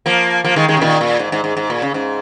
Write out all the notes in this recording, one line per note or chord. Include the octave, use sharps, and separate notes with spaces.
F3 A#3
F3 A#3
D#3 G#3
D#3 G#3
C#3
A#2 D#3
A#2
G#2
G#2
G#2
G#2
A#2
C#3
G#2